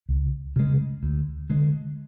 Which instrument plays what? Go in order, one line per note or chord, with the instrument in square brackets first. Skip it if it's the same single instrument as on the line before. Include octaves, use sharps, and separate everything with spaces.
[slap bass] C#2
C#3 G#3
D2
D3 G#3